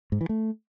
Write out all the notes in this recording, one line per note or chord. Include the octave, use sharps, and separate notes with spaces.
G#2
E3
A3